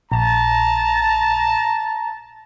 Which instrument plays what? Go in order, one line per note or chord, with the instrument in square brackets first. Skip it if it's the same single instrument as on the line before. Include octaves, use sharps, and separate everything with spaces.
[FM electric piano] A#1 [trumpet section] A5 A#5